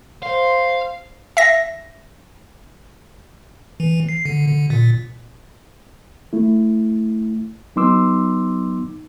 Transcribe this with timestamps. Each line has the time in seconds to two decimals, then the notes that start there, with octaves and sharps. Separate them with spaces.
0.22 C5 F5 C6
1.37 E5 A#6
3.80 E3
4.09 C7
4.25 D3
4.47 D3
4.70 A#2
6.33 A3 E4
7.76 F#3 B3 D#4 C6 D6 E6